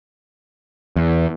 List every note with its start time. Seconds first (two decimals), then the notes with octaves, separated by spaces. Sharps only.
0.96 E2